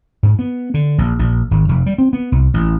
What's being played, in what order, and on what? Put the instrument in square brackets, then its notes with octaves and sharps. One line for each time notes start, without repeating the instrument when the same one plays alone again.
[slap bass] G#2
B3
D3
A#1
A#1
G#1
F1
G3
C4
B3
C2
A1